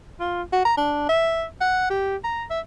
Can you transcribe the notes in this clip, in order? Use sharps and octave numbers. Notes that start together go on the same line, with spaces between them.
F4
F#4
A#5
D4
E5
F#5
G4
A#5
E5